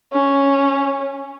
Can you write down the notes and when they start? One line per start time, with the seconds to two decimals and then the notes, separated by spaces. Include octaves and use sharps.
0.13 C#4